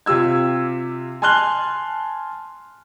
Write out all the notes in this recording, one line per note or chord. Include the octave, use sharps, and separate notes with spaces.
C3 F4 G4 E6 G#6
G#5 A5 C6 F6 F#6 G7